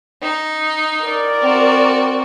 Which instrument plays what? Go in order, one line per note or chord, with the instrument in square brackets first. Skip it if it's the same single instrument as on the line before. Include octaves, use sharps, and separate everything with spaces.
[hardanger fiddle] D#4
[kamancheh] A#4 D5
[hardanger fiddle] C4 F#4